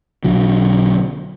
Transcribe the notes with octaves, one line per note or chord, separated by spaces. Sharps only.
B1 D3 F#3